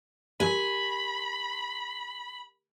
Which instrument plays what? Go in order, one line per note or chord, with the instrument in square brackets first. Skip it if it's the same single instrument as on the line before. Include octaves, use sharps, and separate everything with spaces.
[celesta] G4 A#4 [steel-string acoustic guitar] G#5 [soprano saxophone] B5